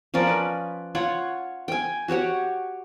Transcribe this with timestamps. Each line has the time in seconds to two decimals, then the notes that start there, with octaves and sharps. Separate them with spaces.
0.14 F3 C#4 A#4 D5
0.27 B4
0.95 F4 C#5 F#5
1.68 G5 G#5
2.08 F#4 G4 C#5 F#5